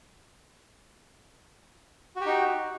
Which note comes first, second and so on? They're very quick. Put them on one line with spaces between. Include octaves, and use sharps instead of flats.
F#4 G4 D#4